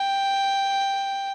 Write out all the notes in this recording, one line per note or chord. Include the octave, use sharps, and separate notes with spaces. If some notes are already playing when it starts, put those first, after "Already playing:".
Already playing: G5